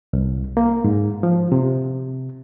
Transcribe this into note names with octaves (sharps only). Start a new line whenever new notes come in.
C2
A#3
G#2
F3
C3